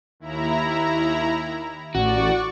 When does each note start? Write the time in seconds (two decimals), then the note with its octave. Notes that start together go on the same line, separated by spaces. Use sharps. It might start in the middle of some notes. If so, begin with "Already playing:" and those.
0.20 D#2 E4 A#5
1.95 A1 F#4 D5 C#6